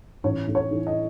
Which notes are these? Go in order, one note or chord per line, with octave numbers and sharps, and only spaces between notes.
A1 C#5
A2
C#5
E3
D#5